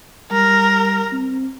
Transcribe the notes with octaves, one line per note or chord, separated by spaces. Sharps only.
G3 A#4
C4